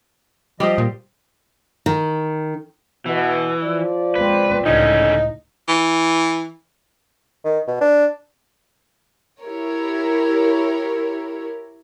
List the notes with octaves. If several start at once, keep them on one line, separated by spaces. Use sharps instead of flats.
F3 G3 G4 C5 D#5
A#2
D#3
B2 E3
F3 D5
G#3 C4 B4
C#2 A2 D3 C#4 D#4
E3
D#3
B2
D4
E4 G4 A#4 C#5